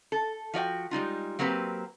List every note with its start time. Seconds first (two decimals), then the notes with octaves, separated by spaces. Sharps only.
0.12 A4
0.54 F3 F#4 D5 G5
0.91 G3 G#3 D#4 F4
1.39 F#3 A#3 C4 G4 B4